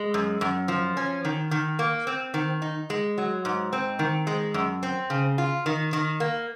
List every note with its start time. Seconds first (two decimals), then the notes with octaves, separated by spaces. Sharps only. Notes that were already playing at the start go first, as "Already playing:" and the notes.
Already playing: G#3
0.14 F#2
0.41 F#2
0.68 F3
0.97 C#4
1.25 D#3
1.51 D#3
1.79 A#3
2.07 C4
2.34 D#3
2.62 D#4
2.90 G#3
3.18 F#3
3.45 G#2
3.73 C4
3.99 D#3
4.27 G#3
4.54 F#2
4.83 C4
5.10 C#3
5.38 F4
5.66 D#3
5.93 D#3
6.20 A#3